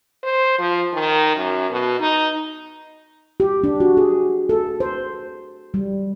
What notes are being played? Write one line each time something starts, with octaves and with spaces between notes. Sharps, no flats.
C5
F3
D#3
F#2
B2
D#4
G4
D4
F#4
G#4
A4
C5
G3